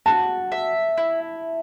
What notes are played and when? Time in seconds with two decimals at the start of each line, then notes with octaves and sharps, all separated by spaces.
0.06 F#4 A5
0.52 E5
0.98 E4